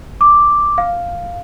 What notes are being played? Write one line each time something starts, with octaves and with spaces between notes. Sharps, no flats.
D6
F5